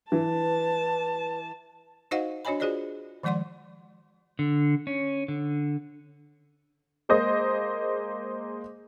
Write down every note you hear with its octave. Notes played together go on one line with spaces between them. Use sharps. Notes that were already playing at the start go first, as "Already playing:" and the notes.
E3 B4 A5
D#4 F#4 C5 D#5 F5 F#5
D4 F#4 C#5 D#5 G#5 B5
F4 F#4 G#4 C5 D5 D#5
D#3 F3 G#3 D5 F#5 C6
D3
C#4
D3
G#3 A#3 C5 D#5